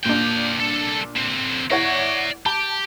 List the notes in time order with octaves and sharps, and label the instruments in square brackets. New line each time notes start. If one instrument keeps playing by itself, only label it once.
[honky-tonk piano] A#2 D4 [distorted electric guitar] A#3 G5
[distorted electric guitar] C2 A4
D3 C4
[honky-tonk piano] E4 C#5 F#5 [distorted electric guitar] D5 A#5
[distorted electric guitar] G4 [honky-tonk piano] A5